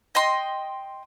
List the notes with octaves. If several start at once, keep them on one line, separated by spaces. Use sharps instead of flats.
D#5 G5 C6